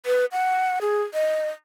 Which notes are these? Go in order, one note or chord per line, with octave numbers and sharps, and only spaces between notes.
B4
F#5
G#4
D#5